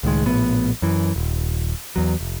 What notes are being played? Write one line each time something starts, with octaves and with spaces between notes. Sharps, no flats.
C#2 A2 D#3 G#3
A#1 A2 B3
F#2 E3
D#1
E2 F#3
F1